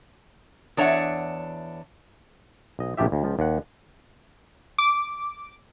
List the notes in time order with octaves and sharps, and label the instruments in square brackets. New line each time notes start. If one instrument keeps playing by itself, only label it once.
[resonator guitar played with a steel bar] E2 D4 C#5 E5 F#5
[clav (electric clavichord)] B1 D#5
A#1 C3 F3 G4 E5
D2
C#2 F3
D#2 F#5
[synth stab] D6